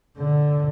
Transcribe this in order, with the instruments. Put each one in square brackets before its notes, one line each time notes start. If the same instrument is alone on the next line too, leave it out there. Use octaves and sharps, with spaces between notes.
[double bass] D3